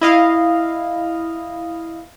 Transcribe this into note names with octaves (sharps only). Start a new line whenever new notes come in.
E4 D#5 F5